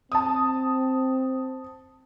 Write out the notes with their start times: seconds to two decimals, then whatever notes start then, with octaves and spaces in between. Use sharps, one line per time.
0.12 C4 A5 D#6